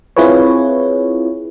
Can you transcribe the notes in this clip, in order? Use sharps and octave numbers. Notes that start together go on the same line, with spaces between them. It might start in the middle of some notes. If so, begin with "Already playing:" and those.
C4 E4 F4 G#4 B4 C#5